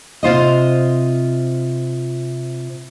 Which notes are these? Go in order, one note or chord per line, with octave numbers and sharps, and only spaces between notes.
C3 F4 C5 D#5